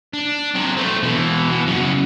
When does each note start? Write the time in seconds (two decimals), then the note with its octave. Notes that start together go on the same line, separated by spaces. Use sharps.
0.13 D4
0.55 C3 F#3
0.77 A3 C4
1.03 B2 E3
1.51 B2
1.67 F#2 C#3